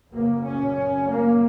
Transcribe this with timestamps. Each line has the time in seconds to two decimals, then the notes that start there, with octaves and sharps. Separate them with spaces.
0.12 F#2 C#3 A#3
0.43 C#4
1.06 A#3